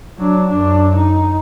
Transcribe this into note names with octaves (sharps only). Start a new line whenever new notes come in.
F#3 D4
F#2 D4
D#4